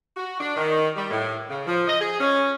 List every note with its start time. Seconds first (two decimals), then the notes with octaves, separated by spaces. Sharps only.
0.17 F#4
0.41 D4
0.57 D#3
0.96 G3
1.11 A2
1.50 C#3
1.67 F3
1.87 D#5
2.01 G#4
2.20 C#4